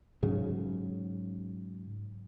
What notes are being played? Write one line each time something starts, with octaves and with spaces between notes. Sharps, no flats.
G#2 C#3 F#3